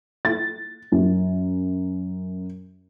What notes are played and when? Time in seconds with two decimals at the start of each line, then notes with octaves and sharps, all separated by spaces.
0.25 A6
0.92 F#2